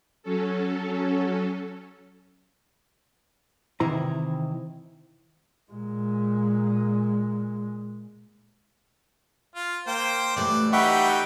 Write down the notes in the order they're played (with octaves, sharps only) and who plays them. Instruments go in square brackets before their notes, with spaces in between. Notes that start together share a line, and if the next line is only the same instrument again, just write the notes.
[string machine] F#3 C#4 A4
[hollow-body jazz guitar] C3 D#3 E3 E4 C5 A#5
[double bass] A#2 G#3
[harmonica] F4
[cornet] A#3 [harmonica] C5 G5
[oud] F#2 E3 A3 [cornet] G3 [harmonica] D5
[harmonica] G3 D#4 G5 [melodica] E5 F#5 C#6 [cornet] B5